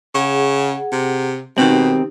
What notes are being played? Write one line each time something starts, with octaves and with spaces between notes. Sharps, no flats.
C#3 G#4 F#5
C3
B2 D#3 C4 D#4 G4